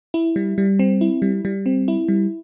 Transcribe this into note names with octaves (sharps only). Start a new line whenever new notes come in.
E4
G3
G3
C4
E4
G3
G3
C4
E4
G3